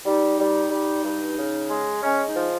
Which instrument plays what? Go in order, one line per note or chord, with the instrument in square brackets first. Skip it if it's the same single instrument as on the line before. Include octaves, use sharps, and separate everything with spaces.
[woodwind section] G3 D#4
G3
G3
G2
C#3
G#3
G#3 C#4
D#4
F3